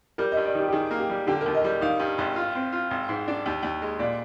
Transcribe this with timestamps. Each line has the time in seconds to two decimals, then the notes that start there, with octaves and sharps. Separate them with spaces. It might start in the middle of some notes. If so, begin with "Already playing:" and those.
0.18 G3 A#4
0.32 D#5
0.37 G2
0.46 D5
0.55 D#3 G4
0.68 G4
0.72 D#3 G#4
0.91 A#3
1.00 G4
1.10 G3
1.27 D3 G4
1.41 A#4
1.46 D#2
1.54 D#5
1.64 G3
1.81 D#3 F5
1.99 G2
2.18 G#1
2.36 F4
2.55 C4
2.72 F4
2.91 G#1
3.09 G#2
3.28 D4
3.46 D#2
3.63 D#2
3.82 G#3
3.99 A#2 D5